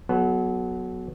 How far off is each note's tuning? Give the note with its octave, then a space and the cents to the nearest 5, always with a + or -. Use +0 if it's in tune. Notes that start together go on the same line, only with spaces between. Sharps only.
F#3 +0 B3 +0 A4 -40